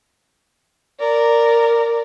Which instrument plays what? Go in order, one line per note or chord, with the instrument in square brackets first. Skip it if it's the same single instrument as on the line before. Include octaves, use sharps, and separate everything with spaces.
[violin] A#4 D5